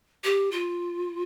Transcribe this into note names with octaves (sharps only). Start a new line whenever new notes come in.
G4
F4